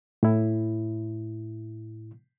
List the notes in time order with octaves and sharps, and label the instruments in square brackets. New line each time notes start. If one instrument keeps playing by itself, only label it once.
[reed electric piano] A2 E4